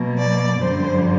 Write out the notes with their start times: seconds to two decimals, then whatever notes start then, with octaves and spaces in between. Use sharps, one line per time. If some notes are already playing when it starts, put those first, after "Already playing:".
Already playing: B2 F#3 A#3
0.17 D5
0.60 F#2 D3 G3 C5